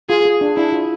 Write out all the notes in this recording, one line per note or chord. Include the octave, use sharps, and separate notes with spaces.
F4 G#4
G#4
D4
D4 E4
F4